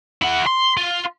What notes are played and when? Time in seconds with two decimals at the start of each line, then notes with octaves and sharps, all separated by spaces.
0.22 E4 F#5
0.47 C6
0.77 F4